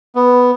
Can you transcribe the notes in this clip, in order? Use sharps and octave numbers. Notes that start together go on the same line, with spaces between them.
B3